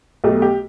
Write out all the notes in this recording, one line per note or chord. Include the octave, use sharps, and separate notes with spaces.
B1 B2 A3 G4
G4